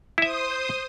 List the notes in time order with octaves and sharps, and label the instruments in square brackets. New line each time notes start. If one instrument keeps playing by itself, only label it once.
[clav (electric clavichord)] E4 E5 [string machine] C5 D#6